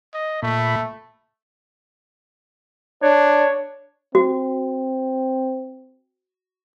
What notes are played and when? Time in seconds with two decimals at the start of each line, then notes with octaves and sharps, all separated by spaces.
0.14 D#5
0.43 A#2 A3 B5
3.02 D4 C#5
4.15 C4 F#4